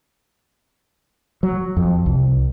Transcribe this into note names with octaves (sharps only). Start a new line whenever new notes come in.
F#3
F2
C2